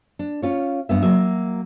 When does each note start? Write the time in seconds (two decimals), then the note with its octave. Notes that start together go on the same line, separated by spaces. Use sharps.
0.19 D4
0.42 C#4 F4 C#5
0.89 G2 B3 E5
1.02 F#3 A#3 E5